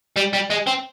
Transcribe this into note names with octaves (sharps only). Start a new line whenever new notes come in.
G3
G3
G#3
C4